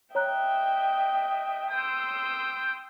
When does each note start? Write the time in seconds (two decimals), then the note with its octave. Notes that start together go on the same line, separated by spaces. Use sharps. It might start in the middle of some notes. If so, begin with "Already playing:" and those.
0.15 C#5 D#5 E5 G5 A#5 F#6
1.71 G5 C6 D#6 E6